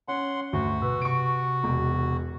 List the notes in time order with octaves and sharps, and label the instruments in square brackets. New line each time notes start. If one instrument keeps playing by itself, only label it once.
[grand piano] C#4 [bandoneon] F#5 C6
[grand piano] D2 [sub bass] G2 [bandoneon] F#4
[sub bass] B2 [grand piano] B4 E6
[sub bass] C3 [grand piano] C#6 D7
[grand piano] E1